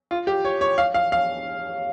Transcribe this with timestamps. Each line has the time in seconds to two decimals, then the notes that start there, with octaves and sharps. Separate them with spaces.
0.11 F4
0.27 G4
0.45 C#5
0.61 C#5
0.78 F5
0.94 F5
1.12 F5